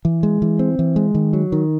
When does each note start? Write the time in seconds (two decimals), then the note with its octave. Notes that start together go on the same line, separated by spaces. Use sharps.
0.05 E3
0.23 G#3
0.42 E3
0.59 C4
0.79 E3
0.96 G#3
1.15 D#3
1.33 F#3
1.52 D#3